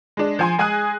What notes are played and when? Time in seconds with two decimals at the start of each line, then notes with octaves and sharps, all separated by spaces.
0.17 G#3 D4
0.39 F3 G#5 C6
0.58 G#3 G#4 G#5 D#6 F#6 D#7